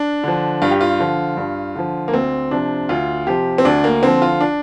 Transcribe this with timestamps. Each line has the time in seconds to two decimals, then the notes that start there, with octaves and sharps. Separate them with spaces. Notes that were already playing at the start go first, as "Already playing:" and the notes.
Already playing: D4
0.24 D3 F3
0.62 G2 F4
0.71 G4
0.81 F4
1.00 D3 F3
1.37 G2
1.75 D3 F3
2.08 A#3
2.13 D2 C4
2.51 C3 F3 D4
2.89 D2 F4
3.27 C3 F3 G4
3.58 C4
3.65 D2 D4
3.84 A#3
4.02 D3 F3 C4
4.22 F4
4.41 D4